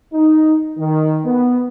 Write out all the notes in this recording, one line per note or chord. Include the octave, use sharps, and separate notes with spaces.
D#4
D#3
B3